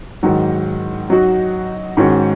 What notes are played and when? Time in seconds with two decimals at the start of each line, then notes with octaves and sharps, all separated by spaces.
0.23 G#2 D#3 F#3
1.10 F#3 D#4 F#4
1.97 G#2 D#3 G#3 C#4 F#4